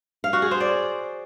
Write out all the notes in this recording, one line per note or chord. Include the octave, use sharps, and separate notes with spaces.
F5
F#4
G#4
C5
D5